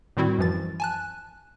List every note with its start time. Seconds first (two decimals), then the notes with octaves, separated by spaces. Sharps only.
0.17 A2 D#3 G3 C4 E4 F#4
0.38 F#2 E3 F3 A6
0.80 G#5 A5 F#6